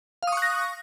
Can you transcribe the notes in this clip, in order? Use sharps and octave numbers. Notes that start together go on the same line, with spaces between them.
F5 C#6 D#6 F#6 A#6